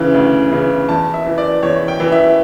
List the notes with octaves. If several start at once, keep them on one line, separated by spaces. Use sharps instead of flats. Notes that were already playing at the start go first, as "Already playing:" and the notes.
Already playing: D2 C#3 E3
D2
C#3 E3
E2 A5
E5
E3
D5
E2 C#5
G5
E3
E5